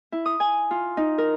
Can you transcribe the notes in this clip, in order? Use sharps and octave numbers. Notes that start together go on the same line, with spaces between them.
E4
D#6
G#5
F4
D#4
A#4